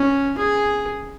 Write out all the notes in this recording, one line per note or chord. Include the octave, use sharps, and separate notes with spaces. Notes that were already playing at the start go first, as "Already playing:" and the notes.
Already playing: C#4
G#4